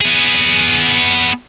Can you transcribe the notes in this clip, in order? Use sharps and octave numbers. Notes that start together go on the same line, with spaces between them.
B3 G#4